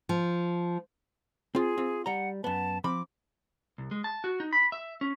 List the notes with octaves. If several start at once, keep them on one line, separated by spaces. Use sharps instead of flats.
F3
C4 F4 G#4
C4 F4
G3 F#5 A#5
F#2 B3 A5
F3 C4 B5 D6
C2
G#3
A5
F#4
D#4
B5
E5
C#4